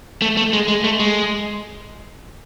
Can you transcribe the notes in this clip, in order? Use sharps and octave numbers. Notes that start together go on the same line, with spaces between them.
A3
A3
G#3
G#3
A3
G#3